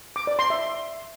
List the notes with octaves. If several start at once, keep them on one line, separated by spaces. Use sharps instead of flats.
D6
D5
C6
E5